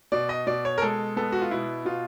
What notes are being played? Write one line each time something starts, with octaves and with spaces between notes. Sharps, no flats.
B2 D5
D#5
B2 D5
C#5
A#4
G#3 A4
B3 A4
F#4
F4
B2 E4
B2 F4